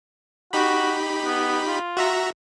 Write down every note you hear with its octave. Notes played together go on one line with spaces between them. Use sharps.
D#4 F#4 G4 B5
B3
F4
F#4 E5 A#5